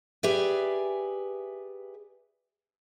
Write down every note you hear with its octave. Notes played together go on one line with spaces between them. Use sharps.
G4 G#4 B4 D5 E5 G#5